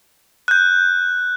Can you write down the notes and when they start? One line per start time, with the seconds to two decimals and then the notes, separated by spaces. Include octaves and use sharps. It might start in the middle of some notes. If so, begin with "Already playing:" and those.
0.48 F#6 G6